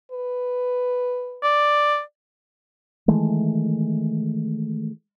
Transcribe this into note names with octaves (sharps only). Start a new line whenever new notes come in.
B4
D5
D#3 E3 G#3 A3